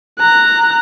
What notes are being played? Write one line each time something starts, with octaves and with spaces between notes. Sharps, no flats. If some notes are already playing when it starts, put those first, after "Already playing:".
A#5 F#6